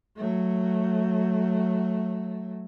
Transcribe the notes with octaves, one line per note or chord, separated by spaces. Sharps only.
F#3 A3